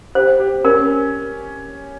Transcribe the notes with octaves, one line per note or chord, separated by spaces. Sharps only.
G4 C5
G4
C#4 A#4